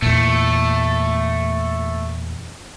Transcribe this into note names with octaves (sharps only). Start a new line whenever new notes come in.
E2 A#2 A3